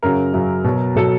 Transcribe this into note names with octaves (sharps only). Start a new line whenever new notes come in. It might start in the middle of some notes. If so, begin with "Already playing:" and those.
F#2 C#3 F#3 A#4
F#2 C#3 F#3
B2 F#3
B2 F#3 A4